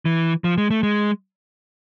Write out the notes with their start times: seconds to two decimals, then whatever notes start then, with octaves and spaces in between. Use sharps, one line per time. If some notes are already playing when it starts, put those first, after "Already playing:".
0.06 E3
0.44 F3
0.58 G#3
0.70 A3
0.83 G#3